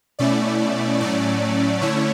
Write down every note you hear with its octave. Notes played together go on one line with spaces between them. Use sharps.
B2 A3 C#4 E4 D5
A2 F#3 A3 C#4 D5
D3 A3 C#4 E4 C#5